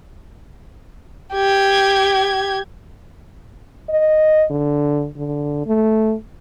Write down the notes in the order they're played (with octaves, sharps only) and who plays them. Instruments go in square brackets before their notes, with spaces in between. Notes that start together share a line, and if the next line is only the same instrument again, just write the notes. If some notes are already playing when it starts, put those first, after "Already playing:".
[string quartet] G4 G#6
[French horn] D#5
D3
D3
A3